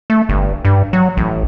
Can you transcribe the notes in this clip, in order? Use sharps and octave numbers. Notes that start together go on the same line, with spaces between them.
A3
G1
G2
F#3
A1